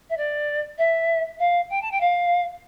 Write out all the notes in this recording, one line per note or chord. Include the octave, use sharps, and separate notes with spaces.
E5
D5
E5
F5
G5
A5
G5
F5